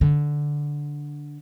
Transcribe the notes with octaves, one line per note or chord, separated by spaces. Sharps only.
D3